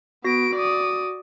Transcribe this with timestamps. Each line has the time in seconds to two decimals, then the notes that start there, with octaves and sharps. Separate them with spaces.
0.24 B3 F#4 A#6 D7
0.55 D5 D#6